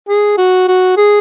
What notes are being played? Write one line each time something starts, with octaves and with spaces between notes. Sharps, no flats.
G#4
F#4
F#4
G#4